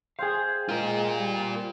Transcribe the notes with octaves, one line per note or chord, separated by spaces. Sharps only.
G#4 C5 F5 G5 G#5
G#3 F4 A#4
G3